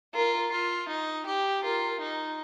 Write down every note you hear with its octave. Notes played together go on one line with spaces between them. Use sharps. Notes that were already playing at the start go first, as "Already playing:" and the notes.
F4 A#4
F4
D#4
G4
F4 A#4
D#4